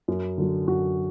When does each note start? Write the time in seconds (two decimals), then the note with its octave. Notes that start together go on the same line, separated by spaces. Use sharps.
0.08 F#2
0.38 D3 F#3
0.67 F#2 F#4